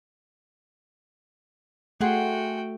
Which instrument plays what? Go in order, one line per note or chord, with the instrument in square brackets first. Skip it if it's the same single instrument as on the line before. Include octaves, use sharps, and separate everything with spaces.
[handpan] A3 [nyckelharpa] F#4 G5 [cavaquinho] G#4 F#5 C6